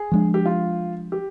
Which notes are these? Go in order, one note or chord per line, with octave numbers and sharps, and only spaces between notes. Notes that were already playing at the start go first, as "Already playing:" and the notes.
Already playing: G#4
F3 G#3 D4
G4
F4
G4